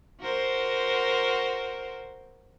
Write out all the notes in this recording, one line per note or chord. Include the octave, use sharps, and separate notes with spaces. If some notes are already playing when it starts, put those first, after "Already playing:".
F#4 A#4 C5